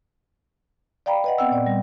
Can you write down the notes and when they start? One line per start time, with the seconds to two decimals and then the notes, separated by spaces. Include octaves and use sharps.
1.06 D5 F5 G5 A#5 B5
1.24 B4 D#5 F#5
1.38 B3 C4 F#5 G5 E6
1.51 A#2 D5
1.66 G3